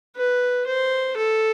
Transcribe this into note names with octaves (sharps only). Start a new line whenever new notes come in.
B4
C5
A4